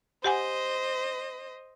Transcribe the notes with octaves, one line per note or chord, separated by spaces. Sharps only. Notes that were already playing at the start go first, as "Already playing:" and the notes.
G4 C5 D#5 F#5 G#5